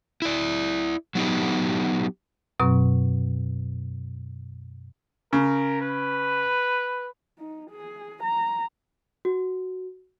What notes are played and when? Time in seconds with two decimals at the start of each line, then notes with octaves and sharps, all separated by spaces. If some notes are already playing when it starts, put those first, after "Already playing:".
0.22 E4 D5
1.15 F#3 B3 D#4 G4
2.60 F#2 B2 F#3 C4 C#6
5.33 C#3 A#4
5.81 B4
7.38 D#4
7.70 G#4
8.23 A#5
9.25 F#4